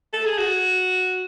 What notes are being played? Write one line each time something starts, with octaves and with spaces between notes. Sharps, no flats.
A4
G#4
F#4